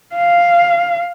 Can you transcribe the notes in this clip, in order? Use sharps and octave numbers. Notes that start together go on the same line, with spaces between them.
F5